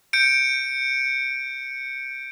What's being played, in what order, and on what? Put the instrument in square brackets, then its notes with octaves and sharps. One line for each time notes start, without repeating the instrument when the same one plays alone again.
[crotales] G6 C#7 D7